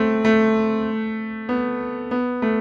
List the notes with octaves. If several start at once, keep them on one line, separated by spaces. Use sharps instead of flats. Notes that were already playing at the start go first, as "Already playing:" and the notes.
Already playing: A3 C4
A3
B3
B3
A3